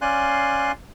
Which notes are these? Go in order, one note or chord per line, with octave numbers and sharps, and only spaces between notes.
C#4 D5 F5 G#5 C6 F#6